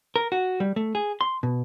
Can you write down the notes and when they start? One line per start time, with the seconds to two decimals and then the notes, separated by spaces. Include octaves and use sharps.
0.16 A#4
0.32 F#4
0.60 G3
0.76 A3
0.95 G#4
1.21 C6
1.43 B2